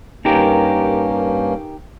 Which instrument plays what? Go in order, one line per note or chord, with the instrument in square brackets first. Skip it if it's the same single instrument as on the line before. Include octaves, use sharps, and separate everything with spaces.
[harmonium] G2 A#3 C#4 [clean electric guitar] D#4 G4 A#4